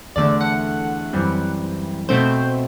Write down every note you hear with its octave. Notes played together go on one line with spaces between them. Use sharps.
E2 D3 A3 D5
F#5
F#2 E3 G3 C4
B2 A3 C4 C5